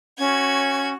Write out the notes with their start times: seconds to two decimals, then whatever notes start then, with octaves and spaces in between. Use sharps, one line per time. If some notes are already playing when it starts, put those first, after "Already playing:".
0.18 C#4 F#4 G#6